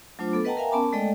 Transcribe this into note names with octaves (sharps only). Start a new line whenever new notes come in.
F#3 A3 D4 F4 C5 D6
B3 A4
B4 D#5 F#5 G5 A5 A#5
A#4 E5 F5 G5 G#5 A#5
B3 C#4 A#4 A5 B5 D6
G#3 A3 A4 D5 D#5 G5